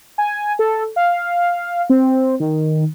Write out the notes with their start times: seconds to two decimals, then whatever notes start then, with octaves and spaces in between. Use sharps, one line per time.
0.18 G#5
0.59 A4
0.96 F5
1.90 C4
2.40 D#3